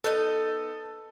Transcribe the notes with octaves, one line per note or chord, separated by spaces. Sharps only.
B3 D#4 A4 D#5